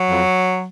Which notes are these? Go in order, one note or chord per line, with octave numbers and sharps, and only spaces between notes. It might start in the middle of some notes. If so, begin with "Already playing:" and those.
Already playing: F#3
F2